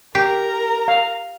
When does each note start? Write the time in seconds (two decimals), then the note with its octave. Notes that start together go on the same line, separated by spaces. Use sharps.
0.15 G4 A#4 A#5
0.88 F5